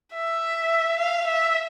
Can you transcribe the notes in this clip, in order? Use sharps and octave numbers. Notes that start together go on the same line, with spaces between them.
E5
F5
E5